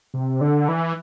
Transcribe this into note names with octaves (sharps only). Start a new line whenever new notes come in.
C3
D3
E3